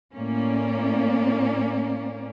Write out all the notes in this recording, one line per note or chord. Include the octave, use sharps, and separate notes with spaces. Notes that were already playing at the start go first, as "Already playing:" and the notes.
A2 A#3 C#4 D5